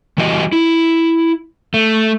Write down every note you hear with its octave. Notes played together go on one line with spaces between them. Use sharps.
E3 G3 F#4 G4 D#5
E4
A3